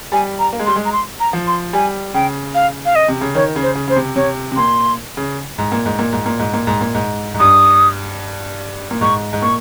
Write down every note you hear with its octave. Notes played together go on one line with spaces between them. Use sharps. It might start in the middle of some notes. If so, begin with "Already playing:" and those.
G3 G#5
A#5
A#3
G#3
G3 C6
G#3
A#5
C6
A#5
F3
C6
G3 G#5
C#3 G5
F5
F5
D#5
C3
C#3
D#3 C#5
C#3
C5
C#3
C#3 C5
C3
C3 C#5
C3
A#2 C6
C#3
G#2
A#2
G#2
A#2
G#2
A#2
G#2
A#2
G#2
A#2
G#2
G#2
G2 D#6
A#2
G#2 C#6
G#2
A#2 C#6